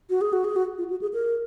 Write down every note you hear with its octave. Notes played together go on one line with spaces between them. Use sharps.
F#4
G#4
F#4
G#4
F#4
F4
F#4
G#4
A#4